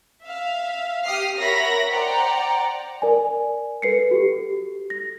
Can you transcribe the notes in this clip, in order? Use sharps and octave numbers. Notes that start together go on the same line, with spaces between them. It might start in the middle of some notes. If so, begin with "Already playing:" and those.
E5 F5
G4 D#6 F6 C7
F#4 A#4 C#5 E5 B5 A#6
C5 D5 F#5 G5 A#5
A#4 D5 G#5
A4 B4 C7 C#7
F#4 G4 A4
A#6